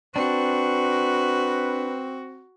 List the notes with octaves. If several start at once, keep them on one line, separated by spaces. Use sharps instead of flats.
C4 D4 F#4 B4